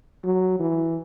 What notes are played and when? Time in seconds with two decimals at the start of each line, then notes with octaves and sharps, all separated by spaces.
0.24 F#3
0.60 E3